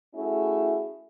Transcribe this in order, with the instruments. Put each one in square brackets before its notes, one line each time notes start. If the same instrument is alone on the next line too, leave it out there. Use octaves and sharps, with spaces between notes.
[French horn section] A3 C#4 E4 F#4 G#4